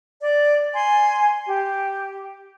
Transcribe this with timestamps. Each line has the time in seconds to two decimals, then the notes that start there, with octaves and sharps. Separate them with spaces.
0.20 D5
0.73 G#5 C6
1.47 G4